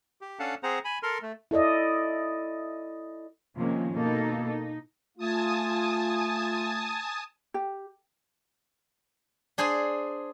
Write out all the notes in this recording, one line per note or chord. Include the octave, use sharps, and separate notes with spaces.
G4
C#4 D4 A4 F5 F#5 A5
C4 G#4 C5 F#5 A#5
G#5 B5
A4 A#4 C6 F6
A3
E4 A4 D5 D#5
C3 D#3 F3 G#3 A#3 C#4
B2 A#3 D#4 A4
D#4
A3 F4 G#5 A5 D#6
G4
D4 G#4 C5 G#5